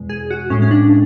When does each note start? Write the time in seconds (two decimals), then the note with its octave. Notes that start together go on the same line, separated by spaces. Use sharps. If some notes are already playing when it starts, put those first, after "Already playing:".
Already playing: E2 B2 G#3
0.09 G#4
0.30 F#4
0.50 A2 G#3 C#4
0.62 C#4
0.71 D4